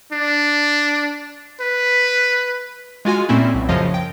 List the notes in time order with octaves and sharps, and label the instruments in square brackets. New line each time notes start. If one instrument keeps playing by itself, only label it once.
[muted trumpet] D4
B4
[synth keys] G#3 F4 F#4 G#5
A#2 A3 C4 C#4 E4
B1
F#2 C#3 F3 D#5
G5